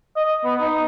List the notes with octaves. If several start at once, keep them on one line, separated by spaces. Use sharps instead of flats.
D#5
B3
D#4